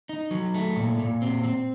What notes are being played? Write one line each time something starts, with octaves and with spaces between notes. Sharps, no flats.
D#4
F#3
A3
A#2
A#2
C4
C4